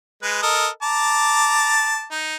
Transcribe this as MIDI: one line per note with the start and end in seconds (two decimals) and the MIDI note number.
0.23 0.38 56
0.23 0.38 71
0.43 0.68 69
0.43 0.68 70
0.43 0.68 75
0.83 2.05 81
0.83 2.05 82
0.83 2.05 86
2.11 2.36 63